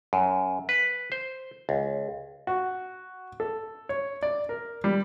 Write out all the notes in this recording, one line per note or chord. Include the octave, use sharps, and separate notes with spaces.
F#2
B4
C5
C#2
F#4
A4
C#5
D5
A#4
G3